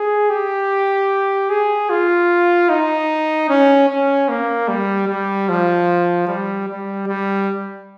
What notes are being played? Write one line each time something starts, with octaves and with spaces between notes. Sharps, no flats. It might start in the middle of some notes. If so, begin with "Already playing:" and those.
Already playing: G#4
G4
G#4
F4
D#4
C#4
C#4
A#3
G3
G3
F3
G3
G3
G3